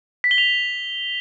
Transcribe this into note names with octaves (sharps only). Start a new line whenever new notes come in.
B6
G7
F7